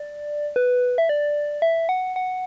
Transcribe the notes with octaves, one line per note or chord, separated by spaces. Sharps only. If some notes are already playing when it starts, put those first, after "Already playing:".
Already playing: D5
B4
E5
D5
E5
F#5
F#5